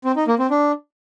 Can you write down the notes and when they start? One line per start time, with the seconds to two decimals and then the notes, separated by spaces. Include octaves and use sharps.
0.05 C4
0.16 D#4
0.28 A#3
0.39 C4
0.51 D4